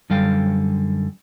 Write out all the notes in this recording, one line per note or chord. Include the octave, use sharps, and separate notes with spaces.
F#2 D3 G3 A4 F5 G5